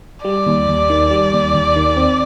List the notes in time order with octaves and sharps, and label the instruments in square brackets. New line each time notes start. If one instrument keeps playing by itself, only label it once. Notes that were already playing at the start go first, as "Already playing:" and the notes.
[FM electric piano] G3 [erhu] D5
[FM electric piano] D#2
D#2
D#3
G3
D#2
D#2
D#3
C4